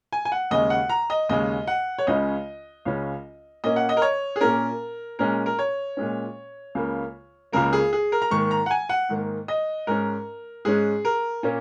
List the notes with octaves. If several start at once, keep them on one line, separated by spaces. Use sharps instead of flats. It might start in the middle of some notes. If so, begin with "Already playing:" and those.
G#5
G#5
F#5
D#2 C#3 G#3 D#5
F#5
A#5
D#5
D#2 C#3 G#3 D#5
F#5
C#5
C#2 C#3 G#3 C#4 D#5
C#2 C#3 G#3 C#4
A#2 A#3 C#4 D#5
F#5
D#5
A#4
C#5
G#4
A#2 A#3 C#4 A#4
A#2 G#3 C#4 A#4
A#4
C#5
A#2 G#3 C#4
C#2 C#3 A#3
C#2 C#3 A#3 A#4
G#4
G#4
A#4
A#5
G#2 D#3 A#3 C#6
A#5
F#5
G#5
F#5
G#2 D#3 A#3
D#5
G#2 G#3 C#4 A#4
G#2 G#3 C#4 G#4
A#4
A#2 A#3 C#4